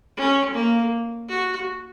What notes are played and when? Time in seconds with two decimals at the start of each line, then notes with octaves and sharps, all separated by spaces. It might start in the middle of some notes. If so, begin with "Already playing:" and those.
0.17 C#4
0.54 A#3
1.29 F#4